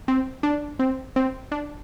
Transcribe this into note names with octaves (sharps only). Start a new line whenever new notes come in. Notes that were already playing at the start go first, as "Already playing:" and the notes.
C4
D4
C4
C4
D4